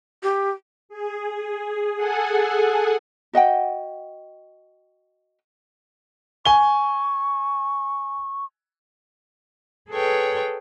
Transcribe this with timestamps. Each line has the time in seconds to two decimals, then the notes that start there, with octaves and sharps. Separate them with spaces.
0.23 G4
0.89 G#4
1.96 G#4 A4 F#5 G#5
3.33 F#4 D#5 F#5 G5
6.45 G#5 C#6 G7
9.90 G#4 A4 B4 C#5 G5